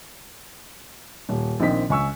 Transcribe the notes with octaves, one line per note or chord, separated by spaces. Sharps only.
D#1
A#1 D#3 C4 D#5 B6
C#2 G#5 C#6 E6